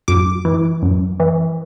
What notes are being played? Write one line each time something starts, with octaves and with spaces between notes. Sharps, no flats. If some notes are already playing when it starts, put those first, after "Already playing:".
F#2 D6
E3
F#2
E3